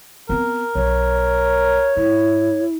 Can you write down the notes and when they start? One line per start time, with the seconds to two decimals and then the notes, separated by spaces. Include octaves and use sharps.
0.29 B3 C4 A#4
0.75 B1 C#5
1.97 G#2 E4